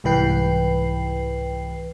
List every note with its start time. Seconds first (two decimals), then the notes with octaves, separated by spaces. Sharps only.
0.04 C2 G#2 E3 B4 G5 C7